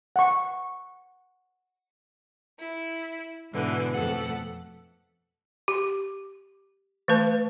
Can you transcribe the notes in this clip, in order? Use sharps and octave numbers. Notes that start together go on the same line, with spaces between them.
F#5 C#6
E4
G#2 B2 D3 E3
F2 B2 A3 A4 F#5 F#6
G4
E3 A3 B4 A5